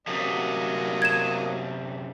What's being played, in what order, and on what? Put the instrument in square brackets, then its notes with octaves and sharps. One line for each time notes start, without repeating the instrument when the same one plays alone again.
[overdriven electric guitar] F#2 C3 [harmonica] F#3 A#3 D#5
[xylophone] G#6 E7